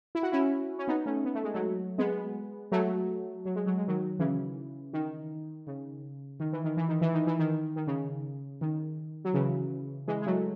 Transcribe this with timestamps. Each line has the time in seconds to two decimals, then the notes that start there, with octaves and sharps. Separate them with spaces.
0.15 E4
0.23 F#4
0.32 C#4 E4
0.79 C#4
0.88 B3 D#4
1.06 A3 C#4
1.25 B3
1.35 A3
1.44 G#3
1.54 F#3 A3
1.98 G#3 B3
2.72 F#3 A3
3.45 F#3
3.56 G#3
3.66 F#3
3.77 G#3
3.88 D#3 F#3
4.19 C#3 E3
4.93 D#3
5.67 C#3
6.40 D#3
6.53 E3
6.64 D#3
6.77 E3
6.89 D#3
7.01 E3
7.14 D#3
7.27 E3
7.39 D#3
7.76 D#3
7.87 C#3
8.61 D#3
9.25 F#3
9.34 C#3 E3
10.08 E3 G#3
10.22 G#3
10.26 F#3 A3